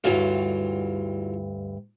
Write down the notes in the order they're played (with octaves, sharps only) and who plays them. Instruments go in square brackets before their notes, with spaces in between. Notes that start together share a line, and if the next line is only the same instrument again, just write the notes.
[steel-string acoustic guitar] D2 G2 [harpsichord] E3 F#3 F4